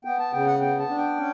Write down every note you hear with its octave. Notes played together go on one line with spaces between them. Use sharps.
B3 G5
A5
C#3 G5
F#5
B3 G5
A5
D4
G5
C#4